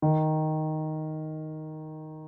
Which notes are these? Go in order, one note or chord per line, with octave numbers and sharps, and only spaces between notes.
D#3